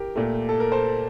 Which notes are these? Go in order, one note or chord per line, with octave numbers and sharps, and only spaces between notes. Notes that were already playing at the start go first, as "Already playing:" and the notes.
Already playing: G4 A#4
A#2 A3
A4
A#4
A4 C5